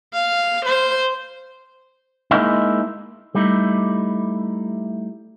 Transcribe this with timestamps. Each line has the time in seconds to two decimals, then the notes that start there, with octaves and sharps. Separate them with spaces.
0.14 F5
0.66 C5
2.31 G#3 A#3 D#4 E4
3.35 G3 A3 D#4 E4